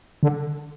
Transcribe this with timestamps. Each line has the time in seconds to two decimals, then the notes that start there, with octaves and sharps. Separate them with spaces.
0.23 D3